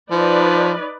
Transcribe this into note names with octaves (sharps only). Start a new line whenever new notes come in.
F3 D#4 B4 D5